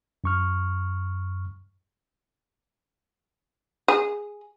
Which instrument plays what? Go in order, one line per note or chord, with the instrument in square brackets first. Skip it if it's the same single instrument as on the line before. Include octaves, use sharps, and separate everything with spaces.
[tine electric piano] F#2 C#6 F6
[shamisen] G#4